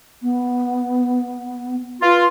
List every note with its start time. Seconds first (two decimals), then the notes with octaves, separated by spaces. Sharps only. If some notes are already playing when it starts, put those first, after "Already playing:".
0.22 B3
2.02 F4 B4